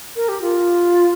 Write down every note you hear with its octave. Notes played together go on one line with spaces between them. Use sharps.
A#4
G4
F4